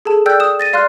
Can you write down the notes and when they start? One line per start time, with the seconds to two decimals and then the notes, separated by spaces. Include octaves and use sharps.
0.05 G#4 A4 A5
0.26 D5 G5 E6 F#6 G6
0.40 D#6 E7
0.60 A6 A#6 D#7
0.73 D5 F5 C6 F6 F#6